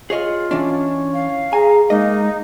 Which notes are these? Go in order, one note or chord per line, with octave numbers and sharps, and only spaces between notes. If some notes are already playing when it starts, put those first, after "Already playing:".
F4 G#4 C#5 D#5
E3 C#4 D4 C#5
F5
G#4 G#5 A#5
G#3 A#3 D#4 D#5